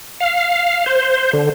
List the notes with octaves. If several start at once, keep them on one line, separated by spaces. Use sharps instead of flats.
F5
C5
D3